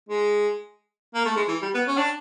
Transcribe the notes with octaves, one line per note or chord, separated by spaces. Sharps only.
G#3
A#3
A3
G#3
E3
G3
B3
C#4
D4